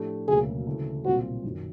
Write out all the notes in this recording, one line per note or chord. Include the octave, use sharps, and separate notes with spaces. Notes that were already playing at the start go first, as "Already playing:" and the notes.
Already playing: A2 F3 A3 D4 G4
E1 D2 C#3 F#3 A#3 G#4
D2 C#3 E3 A3
B1 A#2 G3 C4 F4 F#4
F#2 D#3 F#3